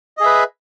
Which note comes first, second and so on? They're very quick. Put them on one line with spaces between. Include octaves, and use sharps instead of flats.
D#5 G#4 E5 B4